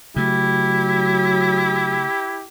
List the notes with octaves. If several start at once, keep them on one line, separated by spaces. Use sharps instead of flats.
C#3 F#3 A3 E4 G4